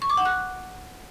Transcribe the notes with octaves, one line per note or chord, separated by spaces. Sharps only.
C#6
D6
F#5
F#6